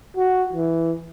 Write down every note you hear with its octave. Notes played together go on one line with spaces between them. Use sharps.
F#4
E3